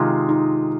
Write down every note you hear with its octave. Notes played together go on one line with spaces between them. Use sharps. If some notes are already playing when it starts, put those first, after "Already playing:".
Already playing: C3 D#3 G#3 D#4 F4
D#4